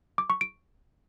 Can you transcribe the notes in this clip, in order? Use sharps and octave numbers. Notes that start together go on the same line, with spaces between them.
D6
C#6
D7